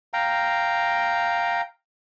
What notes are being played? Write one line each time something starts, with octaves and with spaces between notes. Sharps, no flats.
F5 G5 A#5